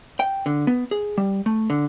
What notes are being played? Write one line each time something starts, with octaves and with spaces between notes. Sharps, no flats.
G5
D3
B3
G#4
G3
A3
D3